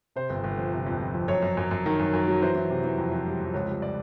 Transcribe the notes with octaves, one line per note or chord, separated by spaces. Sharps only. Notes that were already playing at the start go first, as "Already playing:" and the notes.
C3 C5
G1
G1
F3
C3
F2
F2
F2
F#2 C#5
F#2
F#2
F#2
D#3
F#2
F#2
F#3
E3 C5
E3
C3
E3
F2
F2
G3
F2
C#2 C#5
G3
D5